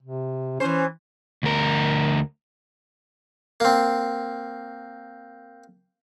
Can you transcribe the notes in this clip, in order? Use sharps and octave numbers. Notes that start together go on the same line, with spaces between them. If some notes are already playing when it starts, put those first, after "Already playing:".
C3
E3 C#4 C5
D2 A#4
A#3 C4